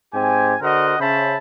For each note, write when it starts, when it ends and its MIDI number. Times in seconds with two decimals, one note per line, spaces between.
0.14 0.55 44
0.14 0.55 60
0.14 0.55 67
0.14 0.55 80
0.61 0.95 50
0.61 0.95 66
0.61 0.95 70
0.61 0.95 72
0.61 0.95 75
0.61 0.95 78
1.00 1.36 49
1.00 1.36 61
1.00 1.36 72
1.00 1.36 76
1.00 1.36 81
1.00 1.36 83